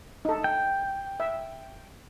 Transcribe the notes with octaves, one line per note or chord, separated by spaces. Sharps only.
D#4 A4
G5
E5